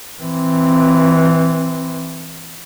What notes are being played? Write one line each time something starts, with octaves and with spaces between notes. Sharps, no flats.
E3 C4